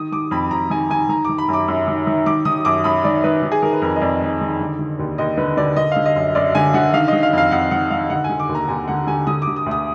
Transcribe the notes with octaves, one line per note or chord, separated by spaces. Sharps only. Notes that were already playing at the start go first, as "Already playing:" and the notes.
Already playing: D#3 D#6
D#3 D6
F2 B5
F2 A#5
D#3 G#5
D#3 G#5
D#3 A#5
D#3 D6
B5
F#2 D6
F#2
D#3
D#3
D#3 D6
D#3 D#6
F#2 D6
F#2 B5
D#3 D5
D#3 B4
D#3
G#4
D#3 A#4
B4
F2 A#4
D#5
F2 D5
D#3
D#3
D3
D3
D#2
D#2 D#5
D3 B4
D3 D5
D3 D#5
D3 F5
D#5
F#2
F#2 D5
D3 G#5
D3 F#5
D#3 F5
D#3 D#5
F5
F2 F5
F2 F#5
D#3 F#5
D#3 F5
D3 F#5
D3 G#5
D6
D#2
A#5
D#2 G#5
D3 F#5
D3 G#5
D3 D#6
D6
D3
D#6
D2
D#6